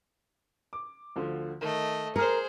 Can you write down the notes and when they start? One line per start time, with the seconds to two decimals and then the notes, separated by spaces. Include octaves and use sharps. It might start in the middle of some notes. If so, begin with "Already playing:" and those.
0.73 D6
1.16 D2 D3 F3
1.61 D#3 A3 D#5
2.16 G#4 A#4 C5 F6 C#7